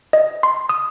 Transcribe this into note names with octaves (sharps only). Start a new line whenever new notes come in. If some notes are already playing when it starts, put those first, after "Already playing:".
D#5
C6
D#6